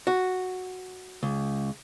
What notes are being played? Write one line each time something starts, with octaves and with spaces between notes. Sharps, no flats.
F#4
C#2